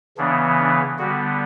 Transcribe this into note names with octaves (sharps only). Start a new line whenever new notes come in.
C#3 E3 B3 D4
D4
D3 G3 B3 F#4